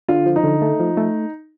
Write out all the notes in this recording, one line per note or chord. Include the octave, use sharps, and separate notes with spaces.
D3 F4
F3
D#4
D3
A3
F3
A3